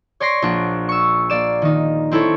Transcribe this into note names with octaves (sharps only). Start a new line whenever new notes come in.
C#5 D5 C6 A#6 C7
A#1 D4 F#5
C#6 E6
A#3 D5 E7
D#3 D#4
C4 E4 A4 C#5